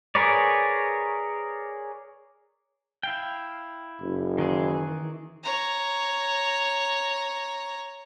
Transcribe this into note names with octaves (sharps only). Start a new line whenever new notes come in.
G#4 A#4 B4 C#5 D5
E4 F5 G5
F#1
D#3 E3 G#4
C#5 A#5